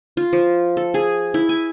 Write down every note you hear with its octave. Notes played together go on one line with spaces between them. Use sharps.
F4
F3
A4
G#4
E4
G#5